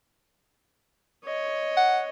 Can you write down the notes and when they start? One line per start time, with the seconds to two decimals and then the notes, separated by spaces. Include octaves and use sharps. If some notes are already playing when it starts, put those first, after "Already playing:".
1.25 C#5 D#5
1.77 F#5